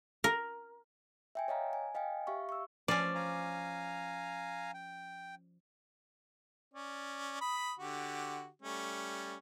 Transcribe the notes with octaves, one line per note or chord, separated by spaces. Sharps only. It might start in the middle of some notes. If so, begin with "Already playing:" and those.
A#4
E5 G5 G#5
C#5 D#5 F5 A#5
G#5
D#5 F5 G5 G#5
G4 E5 F5 C#6
C#6 E6
F3 C#4 D5
F5 G#5 A#5
G5
C#4 D5
B5 D#6
D3 F#4 G4
G3 A3 C#4